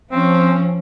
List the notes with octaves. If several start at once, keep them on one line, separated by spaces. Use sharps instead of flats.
F3 C4 C#4